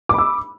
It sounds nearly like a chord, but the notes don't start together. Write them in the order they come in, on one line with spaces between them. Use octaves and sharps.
D6 B5 E6